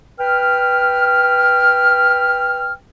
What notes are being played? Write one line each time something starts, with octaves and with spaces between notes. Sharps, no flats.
B4 G5 F6